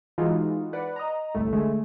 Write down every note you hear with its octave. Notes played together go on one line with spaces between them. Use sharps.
E3 G#3 D#4 F4 F#4
B4 D5 F#5
D#5 A#5
G1 C2 A2 A3
D3 G#3 A3